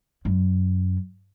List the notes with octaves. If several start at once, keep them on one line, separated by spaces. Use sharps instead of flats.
F#2